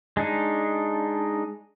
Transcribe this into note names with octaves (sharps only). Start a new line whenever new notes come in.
G#3 D4 D#4